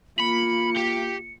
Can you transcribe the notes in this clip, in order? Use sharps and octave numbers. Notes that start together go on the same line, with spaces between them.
A#3 F4 B5 C#7
G4